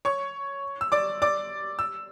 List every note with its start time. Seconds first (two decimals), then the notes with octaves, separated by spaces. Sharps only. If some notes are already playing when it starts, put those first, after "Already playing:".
0.05 C#5 C#6
0.81 E6
0.92 D5 D6
1.22 D5 D6
1.79 E6